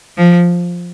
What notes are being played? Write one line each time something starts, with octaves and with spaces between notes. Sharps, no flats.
F3